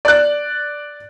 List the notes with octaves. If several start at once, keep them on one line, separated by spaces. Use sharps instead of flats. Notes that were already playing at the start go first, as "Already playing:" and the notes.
D5 F#6